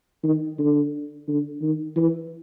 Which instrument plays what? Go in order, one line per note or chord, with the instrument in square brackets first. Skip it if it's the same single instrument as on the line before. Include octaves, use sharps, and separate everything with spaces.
[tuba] D#3
D3
D3
D#3
E3